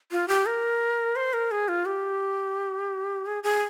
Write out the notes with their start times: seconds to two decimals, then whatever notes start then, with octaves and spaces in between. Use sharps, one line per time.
0.11 F4
0.28 G4
0.46 A#4
1.16 C5
1.33 A#4
1.51 G#4
1.68 F4
1.86 G4
3.26 G#4
3.43 G#4